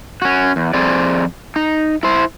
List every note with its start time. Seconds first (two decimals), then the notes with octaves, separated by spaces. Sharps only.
0.22 C#4 F#4
0.56 E2
0.73 F2 C4 G#4 D5
1.56 D#4
2.03 E4 C5